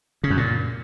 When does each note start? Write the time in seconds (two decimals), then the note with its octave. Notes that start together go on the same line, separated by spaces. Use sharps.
0.24 C#3
0.30 F#2
0.37 A#2